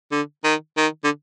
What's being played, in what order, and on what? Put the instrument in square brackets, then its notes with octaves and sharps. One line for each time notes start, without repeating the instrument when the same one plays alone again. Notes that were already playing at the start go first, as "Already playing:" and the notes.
[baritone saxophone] D3
D#3
D#3
D3